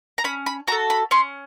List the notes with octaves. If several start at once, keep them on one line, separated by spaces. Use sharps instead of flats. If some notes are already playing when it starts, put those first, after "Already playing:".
A#5
C#4 B5
B5
F#4 A4 A#5
B5
C#4 C6